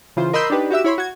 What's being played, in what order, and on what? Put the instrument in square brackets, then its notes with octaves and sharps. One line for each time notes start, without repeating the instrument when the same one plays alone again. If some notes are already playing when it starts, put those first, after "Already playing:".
[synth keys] C#3 E3 F4 C5
A#4 D#5 B5 C6 E6 G6
D4 D#4 G4 B4
F#4 G4 E5 E6
E4 C#5 B5 C6
F#4 G#6